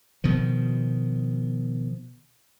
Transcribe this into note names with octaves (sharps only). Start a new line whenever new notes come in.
B2 D#3 F3